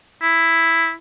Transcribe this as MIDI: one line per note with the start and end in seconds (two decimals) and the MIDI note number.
0.22 0.93 64